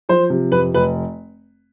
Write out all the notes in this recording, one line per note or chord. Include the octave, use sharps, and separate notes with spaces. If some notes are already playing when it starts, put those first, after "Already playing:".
F3 C5
C3
F2 B4
F1 B4